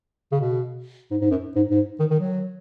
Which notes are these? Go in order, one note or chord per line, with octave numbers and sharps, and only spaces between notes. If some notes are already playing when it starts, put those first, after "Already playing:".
C#3
B2
G#2
G#2
F#2
G#2
G#2
D#3
D#3
F#3